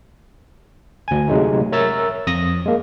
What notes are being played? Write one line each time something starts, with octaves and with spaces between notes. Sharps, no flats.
D2 G#5
C3 F#3 G#3 A3 D#4
A#4 C#5 E5 A#5 E6 A6
F2 D#6 A#6
G#3 A#3